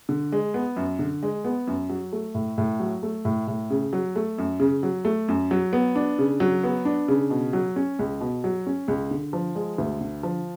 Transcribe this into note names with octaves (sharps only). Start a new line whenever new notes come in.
D3
G#3
B3
F#2
D3
G#3
B3
F#2
F#3
A3
A2
A2
F#3
A3
A2
A2
C#3
F#3
A3
F#2
C#3
F#3
A3
F#2
F#3
B3
D4
C#3
F#3
B3
D4
C#3
B2
F#3
C#4
C#2
B2
F#3
C#4
C#2
D3
F3
G#3
D2
D3
F3